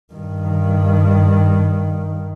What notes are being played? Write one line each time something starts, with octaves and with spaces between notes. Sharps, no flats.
G2 D#3